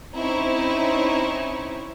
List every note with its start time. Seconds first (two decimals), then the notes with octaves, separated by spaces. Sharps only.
0.17 C4 C#4 D#4 E4 C#5